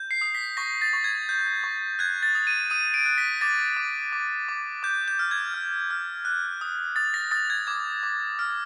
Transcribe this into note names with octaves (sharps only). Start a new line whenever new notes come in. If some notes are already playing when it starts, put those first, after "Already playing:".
Already playing: G6
C7
D#6
B6
C#6 A#6
A6
C#6
G#6
G6
C#6
F#6 G#6
A6
D#6
D#7
D#6 D#7
D7
F#6
B6
D6 A6
D6
D6
D6
D6 G6
G6
F6
G#6
F6
F6
F#6
D#6
D#6 A6
A#6
D#6 A6
G#6
D6 G#6
D6
F6